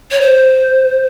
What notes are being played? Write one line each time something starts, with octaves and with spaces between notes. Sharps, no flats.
C#5
C5